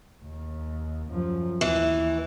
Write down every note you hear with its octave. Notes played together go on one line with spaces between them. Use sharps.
D#2
F#2 F3
D#2 E3